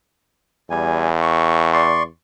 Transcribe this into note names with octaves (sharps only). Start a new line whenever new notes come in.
E2 G3 G#5
C#6
D5 C6 C#6